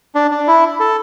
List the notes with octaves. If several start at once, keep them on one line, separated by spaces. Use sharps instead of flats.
D4
D4
E4
A4